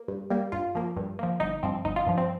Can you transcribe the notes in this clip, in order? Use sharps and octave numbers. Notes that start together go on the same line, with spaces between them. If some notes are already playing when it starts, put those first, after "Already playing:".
Already playing: A#3
G2
G3 A#3
G2 F4
F3 A#3
G2
F3 A#3
G1 D#4
G2 F3 C4
G1 D#4
F4
G2 F3
C4